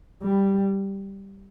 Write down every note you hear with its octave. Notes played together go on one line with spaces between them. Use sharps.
G3